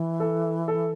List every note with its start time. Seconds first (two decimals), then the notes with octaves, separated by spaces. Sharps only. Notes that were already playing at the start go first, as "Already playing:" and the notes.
Already playing: E3
0.20 A4
0.68 A4